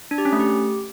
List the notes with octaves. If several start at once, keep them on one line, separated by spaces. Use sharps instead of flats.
D4
G4
C#4
A3
G4